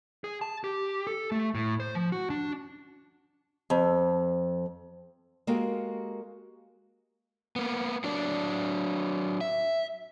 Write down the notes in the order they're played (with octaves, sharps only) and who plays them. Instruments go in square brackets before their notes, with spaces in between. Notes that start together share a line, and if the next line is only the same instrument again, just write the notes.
[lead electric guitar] G#4
A5
G4
A4
A3
A2
C5
F3
F#4
D4
[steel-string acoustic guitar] F2
[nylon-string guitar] G#3 A#3 F#4 G4 A4 A#4
[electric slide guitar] A#3 B3
F#3 D4 D5
E5